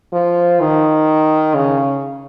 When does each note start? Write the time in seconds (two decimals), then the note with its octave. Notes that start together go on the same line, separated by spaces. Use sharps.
0.13 F3
0.60 D#3
1.55 C#3